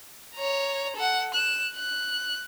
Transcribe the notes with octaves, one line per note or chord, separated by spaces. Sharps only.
C#5 A#5
A4 F#5
F#6 E7
F#6